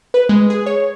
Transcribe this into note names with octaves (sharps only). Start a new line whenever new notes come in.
B4
G#3
G#4
C#5